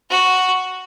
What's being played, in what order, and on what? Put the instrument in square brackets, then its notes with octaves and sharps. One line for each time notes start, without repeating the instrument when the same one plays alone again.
[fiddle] F#4